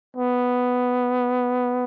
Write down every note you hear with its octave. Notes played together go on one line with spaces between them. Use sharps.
B3